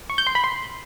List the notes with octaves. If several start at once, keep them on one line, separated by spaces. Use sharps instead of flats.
C#6
G6
C6
B5
C6